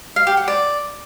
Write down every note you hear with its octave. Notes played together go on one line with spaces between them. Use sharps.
F5
G4
F#5
D5